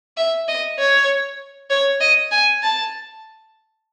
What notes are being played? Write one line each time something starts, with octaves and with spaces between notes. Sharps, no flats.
E5
D#5
C#5
C#5
D#5
G#5
A5